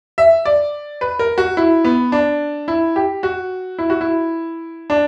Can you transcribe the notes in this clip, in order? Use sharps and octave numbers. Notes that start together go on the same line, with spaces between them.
E5
D5
B4
A#4
F#4
E4
B3
D4
E4
G4
F#4
E4
F#4
E4
D4